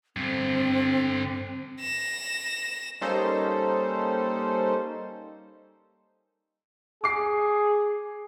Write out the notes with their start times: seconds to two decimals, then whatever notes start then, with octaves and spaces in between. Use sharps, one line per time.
0.16 G2 D3 C4
1.80 A#6 E7
3.01 G3 A#3 C#4 D#4 A4 C5
7.04 G#4 D6 C7